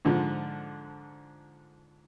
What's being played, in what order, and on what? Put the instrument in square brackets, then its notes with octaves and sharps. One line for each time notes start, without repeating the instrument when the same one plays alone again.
[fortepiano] G#2 D3 F3